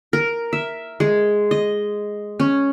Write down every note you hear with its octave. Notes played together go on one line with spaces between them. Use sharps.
A#4
E5
G#3
D#5
C#4